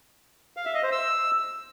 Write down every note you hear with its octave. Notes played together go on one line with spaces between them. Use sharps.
F5
E5
D#5
C5
E6